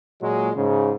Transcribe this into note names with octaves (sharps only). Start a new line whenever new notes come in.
A#2 F#3 G#3
G#2 C#3